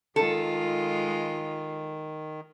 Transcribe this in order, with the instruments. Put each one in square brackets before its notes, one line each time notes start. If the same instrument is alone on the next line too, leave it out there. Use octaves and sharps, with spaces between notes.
[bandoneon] D#3 [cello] G#3 F4 [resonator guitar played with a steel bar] A4